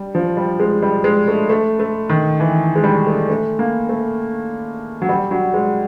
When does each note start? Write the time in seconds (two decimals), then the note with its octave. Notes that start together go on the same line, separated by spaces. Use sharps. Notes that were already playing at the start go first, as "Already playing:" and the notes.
Already playing: G3
0.15 F3
0.37 G3
0.60 G#3
0.82 G3
1.04 G#3
1.28 A3
1.49 A3
1.80 A3
2.09 D#3
2.40 E3
2.76 G#3
2.84 G3
3.06 A3
3.29 A3
3.59 A#3
3.89 A3
5.02 F#3
5.09 G3
5.31 F#3
5.54 G#3